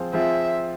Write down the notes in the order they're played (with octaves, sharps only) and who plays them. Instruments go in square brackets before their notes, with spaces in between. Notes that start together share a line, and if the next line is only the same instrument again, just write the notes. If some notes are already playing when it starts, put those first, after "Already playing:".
Already playing: [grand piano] F3 C4 F4 G#4
[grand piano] F3 C4 F4 G#4 [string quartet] E5